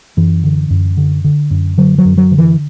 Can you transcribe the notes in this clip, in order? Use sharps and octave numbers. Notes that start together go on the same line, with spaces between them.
F#2 E3
D3
F#2
D3
D3
F#2
D3 F#3
F#3
F#2
F#3
D3
E3